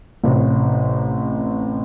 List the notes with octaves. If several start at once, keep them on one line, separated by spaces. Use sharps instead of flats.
A1 C3